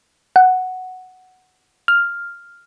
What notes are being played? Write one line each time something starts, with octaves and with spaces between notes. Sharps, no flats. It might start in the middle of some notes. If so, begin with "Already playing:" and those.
F#5
F6